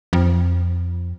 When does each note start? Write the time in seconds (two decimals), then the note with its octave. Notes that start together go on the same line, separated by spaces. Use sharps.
0.13 F2